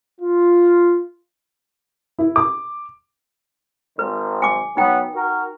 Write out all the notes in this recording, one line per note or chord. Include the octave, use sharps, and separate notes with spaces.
F4
E4
D6
G#1 D#3 B4 C5
G#5 D6
F#3 B3 D#4 G5
F#4 A#4